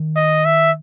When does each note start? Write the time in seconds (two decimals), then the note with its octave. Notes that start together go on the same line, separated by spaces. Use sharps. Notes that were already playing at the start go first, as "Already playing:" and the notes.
Already playing: D#3
0.16 D#5
0.45 E5